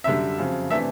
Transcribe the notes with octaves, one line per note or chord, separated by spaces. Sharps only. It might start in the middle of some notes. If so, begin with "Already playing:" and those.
F#2 D3 G3 E5
F2 C#3 F#3
C3 E3 A3 D4 E5